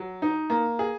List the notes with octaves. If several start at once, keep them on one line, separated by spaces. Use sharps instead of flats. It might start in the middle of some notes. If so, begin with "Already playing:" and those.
Already playing: F#3
D#4
A#3
G#4